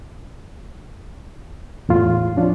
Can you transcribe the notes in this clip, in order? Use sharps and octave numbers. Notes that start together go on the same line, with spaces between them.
E2 A2 F4 C6
F3 C#4 D4 F4